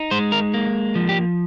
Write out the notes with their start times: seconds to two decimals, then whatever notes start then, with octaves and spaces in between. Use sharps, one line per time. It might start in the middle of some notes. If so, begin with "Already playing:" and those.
Already playing: D#4
0.11 G#3 C5
0.32 A#4
0.54 A#3
0.95 F3
1.09 G4